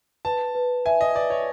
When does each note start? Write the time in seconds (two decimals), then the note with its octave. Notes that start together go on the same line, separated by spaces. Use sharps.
0.25 B4 A5
0.55 B4
0.86 E5 G#5
1.01 D#5
1.15 B4 D5
1.30 C#5